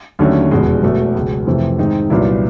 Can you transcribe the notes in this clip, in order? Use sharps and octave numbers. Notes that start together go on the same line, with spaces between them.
D#2 D3 F#3 A3 C#4
F1 E2 B2 G#3
E1 E2 B2 F#3 A3
C#2 B2 G#3
F2 C3 E3 A3 C4
G#2 D#3 G#3 C4 D#4
C2 A#2 F#3 B3 E4